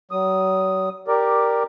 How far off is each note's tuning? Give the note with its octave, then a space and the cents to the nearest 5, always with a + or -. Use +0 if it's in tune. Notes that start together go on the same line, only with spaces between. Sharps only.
F#3 +40 D#6 +0
G4 +0 A#4 +0 D5 +5